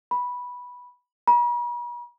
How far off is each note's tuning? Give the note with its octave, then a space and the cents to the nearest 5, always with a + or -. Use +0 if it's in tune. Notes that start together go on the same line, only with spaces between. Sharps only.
B5 -10
B5 -45